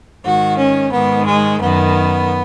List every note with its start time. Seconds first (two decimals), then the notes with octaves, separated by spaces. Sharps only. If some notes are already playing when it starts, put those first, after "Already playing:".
0.23 G#2 D#3 F#4
0.57 C#4
0.91 G#2 D#3 B3
1.25 G#3
1.59 F#2 D#3 B3